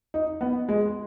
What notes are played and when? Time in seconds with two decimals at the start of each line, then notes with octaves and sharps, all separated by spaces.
0.14 D#4
0.41 B3
0.69 G#3